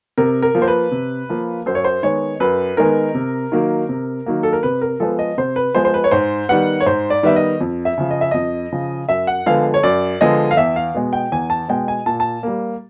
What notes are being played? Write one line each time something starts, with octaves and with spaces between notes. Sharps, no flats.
C3 A#4
A#4
F3 A#3
C5
B4
C3
F3 A#3
F#2 C5
C#5
C5
D#3 G#3 B3 C#5
F#2 B4
D#3 G#3 B3 A#4
C3
D#3 F#3 A#3
C3
D#3 F#3 A#3
A4
A#4
C3 B4
A#4
F3 G#3 B3 A4
D#5
C3 C5
B4
F3 G#3 B3 C5
C5
B4
C#5
G#2 C5
D#3 G3 B3 F#5
C#5
G#2 C5
D5
D#3 G3 B3 E5
D#5
F2
E5
C#3 F3
D#5
E5
F2 D#5
C#3 F3
F#2 E5
F#5
D3 F3 G#3 B3 F5
C#5
F#2 D5
D3 F3 G#3 B3 D#5
F5
E2 E5
F5
B2 G#3
G5
E2 G#5
A5
B2 G#3 G5
G#5
A#2 A5
A5
G3 A#3